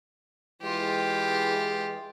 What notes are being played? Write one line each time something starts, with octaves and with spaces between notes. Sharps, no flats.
E3 G#3 F4 G4